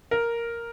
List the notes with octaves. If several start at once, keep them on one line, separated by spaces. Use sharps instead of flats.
A#4